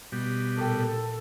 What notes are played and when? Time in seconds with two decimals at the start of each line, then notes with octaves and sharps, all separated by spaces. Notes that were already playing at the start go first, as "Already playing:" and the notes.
0.12 B2 G3
0.59 A#2 A4 G5